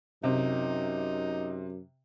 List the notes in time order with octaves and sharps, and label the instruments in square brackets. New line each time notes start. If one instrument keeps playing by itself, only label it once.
[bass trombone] F#2 [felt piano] C3 [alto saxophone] D#4